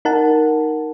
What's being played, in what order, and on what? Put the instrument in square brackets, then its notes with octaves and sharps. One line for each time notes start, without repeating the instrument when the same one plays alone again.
[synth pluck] D#4 A#4 F#5 A5